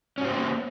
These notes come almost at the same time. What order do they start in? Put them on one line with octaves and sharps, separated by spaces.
C#4 F#4 C5 B3 A#3